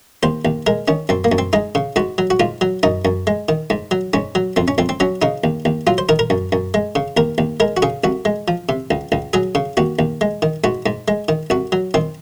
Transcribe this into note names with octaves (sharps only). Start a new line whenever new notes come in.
D#2 C5
D#2
G#3 A#4
D#3 C#4
F#2 C4
A#3
F#2
C4
G#3 D#4
C#3
G#2 F#4
F#3
F#4
G#2 F4
F#3
F#2 D#4
F#2
G#3
D#3
G#2
F#3
G#2 C#4
F#3
F2 C4
C#4
F2 C4
C4
F#3 C#4
C#3 D#4
D#2
D#2
F#3 F4
C5
D#3 A#4
A#4
F#2
F#2
G#3
C#3
D#2 A#4
D#2
G#3 A#4
F#4
C#3 G#4
C2 F#4
G#3
F3
C3
C#2
C#2
F#3 G#4
C#3
D#2 F#4
D#2
G#3
D#3
G#2 F#4
G#2
G#3
D#3
C2 F#4
F#3
D#3 C4